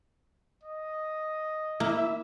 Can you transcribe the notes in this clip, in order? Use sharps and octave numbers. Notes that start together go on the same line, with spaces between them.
D#5
A#3 E4 E5